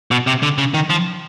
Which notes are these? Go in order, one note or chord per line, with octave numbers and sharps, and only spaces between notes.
B2
C3
D3
C#3
D#3
F3